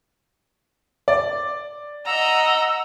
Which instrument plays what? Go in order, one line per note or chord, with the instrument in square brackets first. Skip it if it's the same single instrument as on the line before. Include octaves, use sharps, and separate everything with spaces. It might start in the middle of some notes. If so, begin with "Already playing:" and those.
[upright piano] D5
[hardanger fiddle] D#5 A#5 [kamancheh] F#5 E6